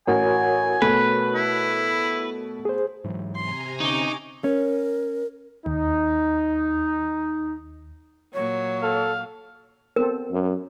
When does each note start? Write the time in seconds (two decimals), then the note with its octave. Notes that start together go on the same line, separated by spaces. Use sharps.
0.07 A1 F#4 A#4 C#5 G#5
0.82 B2 A3 B4
1.35 E4
2.65 G#4 C5
3.04 G#2 E3 F#3
3.35 C3 G#5 A#5 C6
3.80 D3 C#4 D#4 C#6 D6
4.44 C#4 A#4
5.66 D#2 D#4
8.34 A#2 F#3 C#5
8.83 A4 F5
9.96 B3 C4 A4 A#4
10.31 F#2